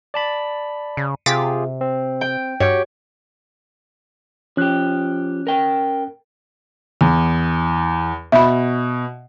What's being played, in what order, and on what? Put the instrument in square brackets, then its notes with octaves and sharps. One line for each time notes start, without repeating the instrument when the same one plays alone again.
[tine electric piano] D5 A5 B5
[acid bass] C#3
[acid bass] C3 [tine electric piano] F4 G4 G#4 [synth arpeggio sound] D6 A6 B6
[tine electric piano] C4
[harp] G5
[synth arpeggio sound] G2 [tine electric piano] F#4 G4 G5 [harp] C#5
[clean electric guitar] F3 G4 [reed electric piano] C#4 F#6
[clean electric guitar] A#4 G5
[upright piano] E2
[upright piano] B2 [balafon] E5 B5